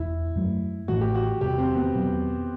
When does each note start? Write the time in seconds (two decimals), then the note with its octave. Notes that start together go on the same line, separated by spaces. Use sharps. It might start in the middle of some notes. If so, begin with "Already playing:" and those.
Already playing: E1 E2 E4
0.35 F#2 F#3 A3
0.88 A1 A2 E3 A3 F#4
1.01 G4
1.15 F#4
1.41 E1 E2 C3 G3 G4
1.58 C4
1.75 B3
1.94 E2 B2 F#3